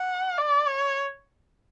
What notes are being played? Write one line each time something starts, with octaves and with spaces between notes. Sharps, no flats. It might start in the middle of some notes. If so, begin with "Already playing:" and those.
Already playing: F#5
D5
C#5